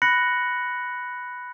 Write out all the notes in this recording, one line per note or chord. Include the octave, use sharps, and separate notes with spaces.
B5 F#6 A#6 C#7 F#7